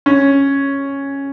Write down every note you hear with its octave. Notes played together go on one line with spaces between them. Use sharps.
C#4